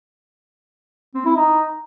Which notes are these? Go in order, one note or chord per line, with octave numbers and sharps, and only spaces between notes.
C4
E4
D#4